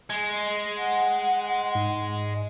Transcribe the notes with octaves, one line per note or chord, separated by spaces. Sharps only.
G#3 G#6
F#5
G#2